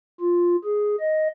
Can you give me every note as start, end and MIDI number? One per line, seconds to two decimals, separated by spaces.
0.20 0.56 65
0.64 0.96 68
1.00 1.28 75